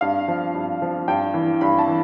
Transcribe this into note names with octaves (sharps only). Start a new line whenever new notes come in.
G2 F5
F3
G2
F3
G2 G5
E3
G2 B5
A5
E3